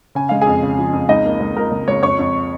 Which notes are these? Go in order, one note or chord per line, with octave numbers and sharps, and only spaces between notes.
C#3 G#5
G#3 F5
G#4 G#5
F2
C#3
F3
F2
C#2 D#4 D#5
A#3
C#2
C#2 A#4
C#2
C#2 C#5
F2 C#5 C#6
F2